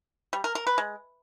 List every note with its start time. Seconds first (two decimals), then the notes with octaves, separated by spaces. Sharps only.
0.33 G3
0.44 A#4
0.55 A#4
0.67 B4
0.78 G#3